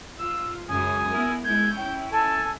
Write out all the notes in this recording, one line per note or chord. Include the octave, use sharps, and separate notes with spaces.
F4 E6
F#2 C#3 G#3 G#5 D#6
B3 E4 A#4
G#3 E4 G6 G#6
C#4 E4 G5
A4 G#5 A5